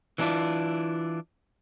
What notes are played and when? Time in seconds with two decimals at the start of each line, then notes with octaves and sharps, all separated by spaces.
0.18 E3 G#3 A#3 D4 E4 F4